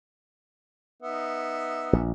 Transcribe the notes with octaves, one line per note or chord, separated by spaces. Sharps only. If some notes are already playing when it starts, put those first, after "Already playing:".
B3 D#4 E5
A#1